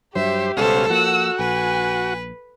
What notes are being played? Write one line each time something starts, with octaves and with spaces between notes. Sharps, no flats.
G2 F#3 G4 C5 E5
C#2 B2 G3 C#4 A4 C5 F5
F3 A#3 F#4 F#5 E6
A#1 B4 G#5